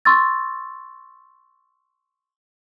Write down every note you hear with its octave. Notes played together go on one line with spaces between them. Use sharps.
C6 C#6 E6 A6